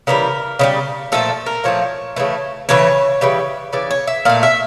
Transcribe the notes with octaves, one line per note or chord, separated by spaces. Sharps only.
C#3 E3 G3 A#4
C#3 E3 G3
A#2 F3 A3 A4
A#4
A#2 F3 A3 C#5
C#3 E3 A3
C#3 E3 A3 C#5
C#3 E3 G3
C#3 E3 D5
C#5
E5
A#2 A3 F5
E5